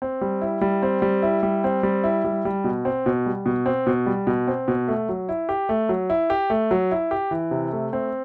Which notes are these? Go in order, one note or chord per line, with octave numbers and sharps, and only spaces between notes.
C4
G3
E4
G3
C4
G3
E4
G3
C4
G3
E4
G3
G3
B2
C4
B2
G3
B2
C4
B2
G3
B2
C4
B2
A3
F#3
E4
G4
A3
F#3
E4
G4
A3
F#3
E4
G4
E3
C3
A3
C4